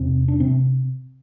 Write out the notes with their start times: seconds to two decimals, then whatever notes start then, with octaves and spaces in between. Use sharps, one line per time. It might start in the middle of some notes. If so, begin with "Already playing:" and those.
Already playing: E2 C3 C4
0.28 D4
0.40 C3 C4